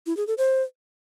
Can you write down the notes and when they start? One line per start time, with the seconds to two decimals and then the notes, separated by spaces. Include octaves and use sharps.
0.06 E4
0.17 G#4
0.27 A4
0.38 C5